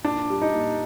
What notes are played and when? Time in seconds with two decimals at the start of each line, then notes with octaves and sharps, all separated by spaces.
0.04 A#2 D4
0.30 G3
0.42 D#4
0.54 A#2